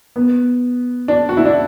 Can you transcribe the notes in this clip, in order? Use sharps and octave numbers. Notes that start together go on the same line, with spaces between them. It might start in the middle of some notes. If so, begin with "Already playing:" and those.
B3
D4
F#4
E4
D4